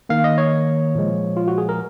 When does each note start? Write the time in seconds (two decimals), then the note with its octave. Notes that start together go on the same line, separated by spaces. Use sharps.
0.09 D#3 A#3 F5
0.24 D#5
0.38 C#5
0.95 A#2 F3 G#3
1.37 F4
1.48 F#4
1.58 G#4
1.69 A#4